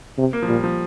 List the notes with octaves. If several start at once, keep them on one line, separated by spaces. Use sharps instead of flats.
C3
A#3
F3
A#2 G3
F3